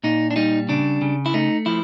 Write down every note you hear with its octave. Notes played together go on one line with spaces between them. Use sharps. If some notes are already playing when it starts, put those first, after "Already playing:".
A#2 D#4
D4
G3 D#4
C#3 D4
C#3
E4
A3 D#4
F3 E4